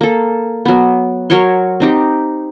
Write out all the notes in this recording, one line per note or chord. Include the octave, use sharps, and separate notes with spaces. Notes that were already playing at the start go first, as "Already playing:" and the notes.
A#3 A4
F#3 B3
F#3 A#4 C#5 C6
C4 D#4 G4